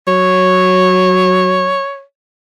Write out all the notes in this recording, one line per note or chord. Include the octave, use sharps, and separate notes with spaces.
F#3 C#5